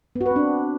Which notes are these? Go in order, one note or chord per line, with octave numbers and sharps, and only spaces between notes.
B3
F#4
B4
C4
D4